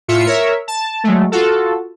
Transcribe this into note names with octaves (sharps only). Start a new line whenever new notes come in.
A2 F4 E5 C#7
A#4 C#5 E5
A5
F#3 G#3 A3
F4 F#4 A4